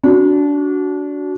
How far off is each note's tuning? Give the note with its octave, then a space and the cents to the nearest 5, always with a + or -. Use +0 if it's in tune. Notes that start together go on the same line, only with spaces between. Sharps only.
D4 -25 F#4 +0